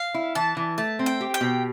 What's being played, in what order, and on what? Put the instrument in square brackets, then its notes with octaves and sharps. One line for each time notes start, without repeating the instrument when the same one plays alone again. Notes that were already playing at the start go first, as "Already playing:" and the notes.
Already playing: [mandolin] F5
[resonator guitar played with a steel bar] E4
[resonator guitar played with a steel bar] E3 [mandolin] A5
[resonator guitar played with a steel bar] E3
[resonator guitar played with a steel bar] A3 [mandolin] A5
[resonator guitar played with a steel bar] C4
[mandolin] G5
[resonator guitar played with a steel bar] G4
[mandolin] G5
[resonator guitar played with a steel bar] B2